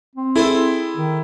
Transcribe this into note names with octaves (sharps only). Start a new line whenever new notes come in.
C4
E4 G#4 A4 C5
D#3